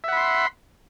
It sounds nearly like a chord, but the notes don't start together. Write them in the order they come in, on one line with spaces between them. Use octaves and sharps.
E5 F#5 B5 C6